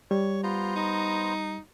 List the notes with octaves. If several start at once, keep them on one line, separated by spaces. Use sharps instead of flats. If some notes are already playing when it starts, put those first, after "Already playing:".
G3 C#5
B3 F4 C5 A#5
D#4